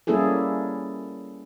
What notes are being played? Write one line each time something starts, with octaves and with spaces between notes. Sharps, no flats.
G3 A#3 C#4 E4 G#4 A4